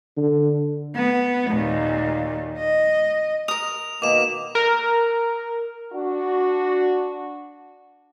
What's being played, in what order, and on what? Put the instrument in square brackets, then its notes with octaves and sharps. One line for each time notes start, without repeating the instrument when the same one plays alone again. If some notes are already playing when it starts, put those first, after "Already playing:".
[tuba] D3
[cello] B3
D#2 A#2
D#5
[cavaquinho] A#4 D#6 [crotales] F7
[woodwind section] B2 D#3 A#3 [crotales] D6 E7
[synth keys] A#4
[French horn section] D4 F#4